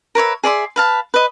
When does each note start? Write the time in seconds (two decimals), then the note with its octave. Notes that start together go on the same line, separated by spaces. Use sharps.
0.15 A#4 B4 C#5 E5
0.43 G#4 D5 E5 C6
0.76 B4 F5 A5
1.14 B4 D#5